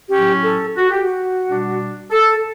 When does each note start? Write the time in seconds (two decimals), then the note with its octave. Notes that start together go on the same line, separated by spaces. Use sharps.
0.10 A2 F#3 C#4 G4
0.44 A4
0.77 F#4
0.90 G4
1.03 F#4
1.44 B2 G3 D4
2.11 A4